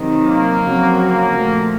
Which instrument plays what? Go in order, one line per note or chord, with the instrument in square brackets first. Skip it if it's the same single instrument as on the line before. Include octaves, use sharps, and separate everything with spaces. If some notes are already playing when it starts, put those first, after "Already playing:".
Already playing: [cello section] C3 D#3 F#3
[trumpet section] A#3
[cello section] F2 C#3 F#3 C4 F#4
[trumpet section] A#3
[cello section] A#2 F3 A3